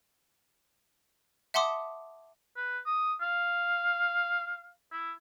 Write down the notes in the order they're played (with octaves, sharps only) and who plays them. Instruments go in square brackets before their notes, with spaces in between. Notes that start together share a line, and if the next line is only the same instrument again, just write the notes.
[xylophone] E5 F#5 A5 C6 D6 D#6
[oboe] B4
D#6
F5
E4